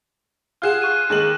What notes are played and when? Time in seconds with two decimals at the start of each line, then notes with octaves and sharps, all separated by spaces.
0.62 F4 G#4 F#5 F6 F#6 E7
0.82 C#6 F#6 D#7
1.10 D#2 G#3 F#7